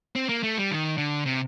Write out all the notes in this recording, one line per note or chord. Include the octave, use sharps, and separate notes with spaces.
C4
A#3
A3
G3
D#3
D3
C3